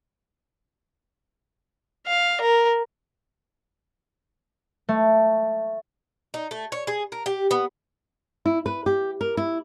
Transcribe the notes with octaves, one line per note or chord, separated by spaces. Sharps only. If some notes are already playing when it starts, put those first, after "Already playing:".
F5
A#4
A3
D#4
A3
C#5
G#4
A#4
G4
B3
E4
B4
G4
A#4
E4